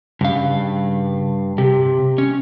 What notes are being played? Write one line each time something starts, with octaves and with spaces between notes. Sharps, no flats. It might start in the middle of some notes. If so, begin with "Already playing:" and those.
G2 C#3 F5
C3 G4
C#4